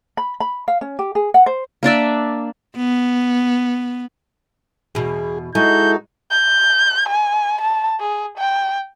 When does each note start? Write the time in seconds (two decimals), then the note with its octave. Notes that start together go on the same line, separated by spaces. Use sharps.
0.17 B5
0.40 B5
0.68 F5
0.81 C#4
0.99 G4
1.15 G#4
1.34 F#5
1.46 C5
1.83 A#3 D4 D5 E5
2.77 B3
4.95 E2 B2 G#4
5.55 G#3 D#4 E4 F#4 A4 G6
6.31 G6
7.08 G#5
7.60 A5
8.00 G#4
8.37 G5